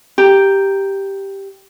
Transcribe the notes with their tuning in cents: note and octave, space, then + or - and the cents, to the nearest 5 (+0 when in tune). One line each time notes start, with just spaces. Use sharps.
G4 +0 A#5 +0